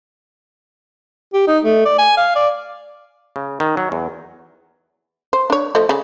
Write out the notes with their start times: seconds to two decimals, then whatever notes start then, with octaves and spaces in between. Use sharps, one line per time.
1.34 G4
1.47 D#4
1.65 A3
1.85 D5
1.98 G#5
2.17 F5
2.35 D5
3.36 C#3
3.60 D#3
3.77 F#3
3.92 E2
5.33 C5
5.50 D4 C#5
5.75 F3 A3 D#5
5.89 C#3